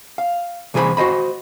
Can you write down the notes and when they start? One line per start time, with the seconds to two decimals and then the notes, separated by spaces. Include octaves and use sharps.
0.18 F5
0.74 C2 E3 G#4 A#4 C5 B5
0.97 F#4 C5 D#5 B5